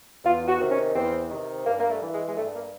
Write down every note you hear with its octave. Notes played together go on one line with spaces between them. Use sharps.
E2 F4
F#4
C3 D#3
C#4
E2 C4
C3 D#3
G2 A#3
A#3
A3
E3
G#3
G#3
G2 A3
A#3